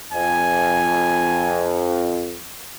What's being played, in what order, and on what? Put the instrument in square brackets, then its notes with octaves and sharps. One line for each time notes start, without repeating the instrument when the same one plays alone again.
[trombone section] F2 [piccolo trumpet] G#5